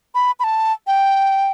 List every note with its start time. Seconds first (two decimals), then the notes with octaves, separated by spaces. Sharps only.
0.15 B5
0.40 B5
0.44 A5
0.87 G5